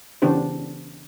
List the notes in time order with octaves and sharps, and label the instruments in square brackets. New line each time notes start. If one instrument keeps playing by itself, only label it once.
[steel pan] C#3 E3 B3 D4 G4 C5